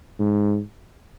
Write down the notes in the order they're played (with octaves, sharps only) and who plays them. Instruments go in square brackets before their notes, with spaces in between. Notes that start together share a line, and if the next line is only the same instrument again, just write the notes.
[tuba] G#2